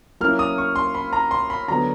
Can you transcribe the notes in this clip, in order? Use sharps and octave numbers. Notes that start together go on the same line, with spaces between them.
F#3 A#3 C#4 E4 F6
D#6
C#6
C6
B5
A#5
C6
B5
D3 F#3 B3 A#5